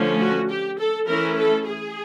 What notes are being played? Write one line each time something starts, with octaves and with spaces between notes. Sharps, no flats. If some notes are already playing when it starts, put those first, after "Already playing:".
Already playing: D3 F3 A3 C#4
F#4
G4
A4
E3 A3 C#4 E4 A#4
A4
G#4